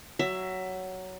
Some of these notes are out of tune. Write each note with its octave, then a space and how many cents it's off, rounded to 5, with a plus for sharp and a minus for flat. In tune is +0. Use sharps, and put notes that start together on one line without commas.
F#3 +10 E5 +15